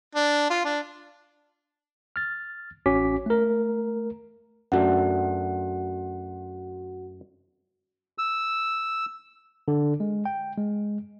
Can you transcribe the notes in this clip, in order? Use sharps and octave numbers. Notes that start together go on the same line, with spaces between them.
D4
F4
D4
F6 A6
A1 C#4 F#4 D6 B6
A3 A#4
F#2 A3 D4 F#4 F#5
E6
D3
G#3
G5
G#3